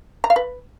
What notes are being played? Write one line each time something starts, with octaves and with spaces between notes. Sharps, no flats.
A#5
F5
B4